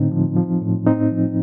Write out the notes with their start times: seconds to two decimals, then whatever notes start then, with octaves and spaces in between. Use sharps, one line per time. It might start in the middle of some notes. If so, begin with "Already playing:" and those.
Already playing: A2 D3 C4 D#4
0.11 F3
0.37 F3
0.62 A2
0.86 A2 C4 D#4
1.12 F3